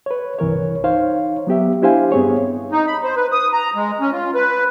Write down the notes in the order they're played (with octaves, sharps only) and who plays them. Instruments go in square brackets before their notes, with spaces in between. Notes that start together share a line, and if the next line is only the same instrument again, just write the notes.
[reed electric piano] B4 C#5
C2 G2 E3 A#4 C#5
D#4 C5 C#5 F5
F#3 B3 G4 E5
D4 E4 G4 C5 F5 G#5
G2 B3 C4 G#4 C#5
[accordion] D#4
B5
C5
B4
D#6
A#5
G#3
C#4
F4
B4